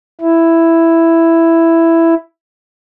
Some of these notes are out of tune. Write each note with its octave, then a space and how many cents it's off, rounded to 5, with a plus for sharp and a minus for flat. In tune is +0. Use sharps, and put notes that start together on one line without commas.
E4 +5